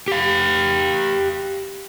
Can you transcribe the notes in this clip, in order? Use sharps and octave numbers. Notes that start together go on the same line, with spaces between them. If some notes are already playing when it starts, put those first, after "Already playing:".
G4 F5